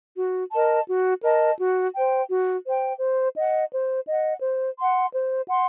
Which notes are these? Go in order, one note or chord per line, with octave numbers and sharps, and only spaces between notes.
F#4
A#4 D#5 A5
F#4
A#4 D#5 A5
F#4
C5 G5
F#4
C5 G5
C5
D#5 F#5
C5
D#5 F#5
C5
F#5 C6
C5
F#5 C6